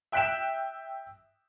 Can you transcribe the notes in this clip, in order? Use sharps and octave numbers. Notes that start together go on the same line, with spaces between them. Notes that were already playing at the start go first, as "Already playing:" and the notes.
E5 G5 F#6 B6 D7 E7